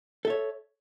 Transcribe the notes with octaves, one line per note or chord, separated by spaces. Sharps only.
A4 C#5 E5